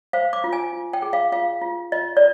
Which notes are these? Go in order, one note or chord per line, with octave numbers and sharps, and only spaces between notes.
C5 F5
D6
F4
G#5
F4
G5
G#4
F5
F4 F5
F4
F4 D#5
D5